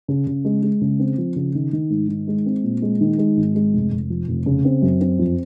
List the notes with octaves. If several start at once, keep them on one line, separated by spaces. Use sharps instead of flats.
C#3
C#3
G#3
G#3
C#3
C4
F3
C#3
D#3
D#3
G#2
D#3
G#3
C4
A#2
G#3
D#3
G#3
G#1
G#3
F1
F1
F3
F1
C#3
C4
F#2
C4
F2